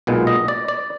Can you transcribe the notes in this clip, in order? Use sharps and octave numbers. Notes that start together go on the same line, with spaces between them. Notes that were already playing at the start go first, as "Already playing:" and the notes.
B1 A#2 G#3 B3
D#5
D5
D5